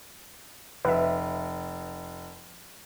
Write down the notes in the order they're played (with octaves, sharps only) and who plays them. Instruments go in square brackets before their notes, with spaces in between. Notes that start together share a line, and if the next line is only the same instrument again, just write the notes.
[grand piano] F1 [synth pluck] B4 E5